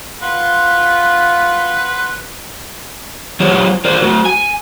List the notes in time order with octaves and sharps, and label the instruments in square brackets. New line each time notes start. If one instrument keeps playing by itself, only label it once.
[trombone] F4 [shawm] B4 [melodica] F#5 C6
[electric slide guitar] F#3 E4 F4 G4 C5 C#5
F4 A#4 C5 D5
F#3 A3 F#4
G#5